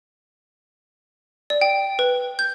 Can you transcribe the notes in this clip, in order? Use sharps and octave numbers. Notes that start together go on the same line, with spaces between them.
D5
G5
B4
G6